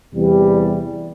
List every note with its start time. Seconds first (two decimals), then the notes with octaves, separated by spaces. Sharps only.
0.12 E2 C3 E3 G3